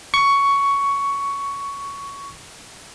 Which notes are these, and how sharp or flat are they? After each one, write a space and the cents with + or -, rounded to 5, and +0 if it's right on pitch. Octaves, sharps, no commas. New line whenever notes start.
C#6 +10